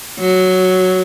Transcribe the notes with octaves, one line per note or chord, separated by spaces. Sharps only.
F#3